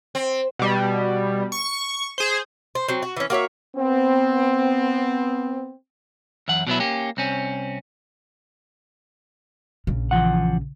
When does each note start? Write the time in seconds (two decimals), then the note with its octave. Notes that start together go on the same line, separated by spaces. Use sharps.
0.15 C4
0.59 B2 G3
1.52 C#6
2.18 G#4 C5
2.75 C5
2.88 F#3 C4
3.02 F#4
3.17 E3 C#4
3.30 A#3 F#4 C#5 E5
3.76 B3 C4
6.48 F#2 E3 F#5
6.67 B2 F#3 B3 E4
6.80 A#3 C#4 G4
7.17 C2 C4 C#4
9.87 A#1 C#3
10.11 E3 F3 F#5